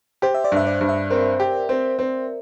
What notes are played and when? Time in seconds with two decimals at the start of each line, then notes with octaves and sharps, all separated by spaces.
0.22 G4 C5
0.34 E5
0.44 D5
0.52 G2 E5
0.67 D5
0.81 G2
0.89 E5
1.10 C4 A#4
1.40 G4
1.69 C4
1.99 C4